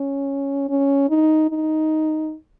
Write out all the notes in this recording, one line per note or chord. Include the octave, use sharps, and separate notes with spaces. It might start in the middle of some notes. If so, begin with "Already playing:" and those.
Already playing: C#4
C#4
D#4
D#4